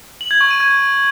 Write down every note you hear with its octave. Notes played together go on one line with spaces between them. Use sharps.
F#7
G#6
C#6
D#7
G#6